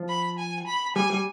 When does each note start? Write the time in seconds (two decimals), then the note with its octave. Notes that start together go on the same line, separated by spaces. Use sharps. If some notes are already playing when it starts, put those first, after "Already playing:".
Already playing: F3
0.09 B5
0.38 G#5
0.67 B5
0.96 G3 G#5
1.10 G3